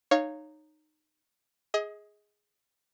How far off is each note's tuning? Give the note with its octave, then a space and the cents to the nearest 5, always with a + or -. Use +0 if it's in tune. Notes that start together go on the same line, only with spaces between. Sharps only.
D#4 -15 C#5 +0 F5 +0
G#4 +0 D#5 +30